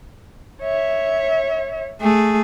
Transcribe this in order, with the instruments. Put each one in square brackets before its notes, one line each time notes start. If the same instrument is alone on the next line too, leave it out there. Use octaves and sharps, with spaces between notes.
[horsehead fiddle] C#5 E5
[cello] A3 G#4